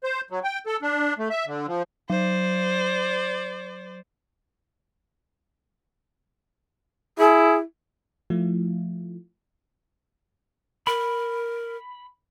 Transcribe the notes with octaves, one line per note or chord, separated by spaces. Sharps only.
C5
F#3
G5
A4
D4
A3
E5
D3
F3
F#3 C5 D5
E4 G#4
F3 A3 E4 F4
A#4 B5